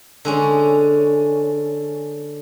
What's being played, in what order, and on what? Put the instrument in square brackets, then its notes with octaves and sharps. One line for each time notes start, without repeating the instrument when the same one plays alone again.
[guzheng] D3 G#3 C#4